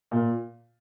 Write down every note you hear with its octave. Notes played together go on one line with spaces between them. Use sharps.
A#2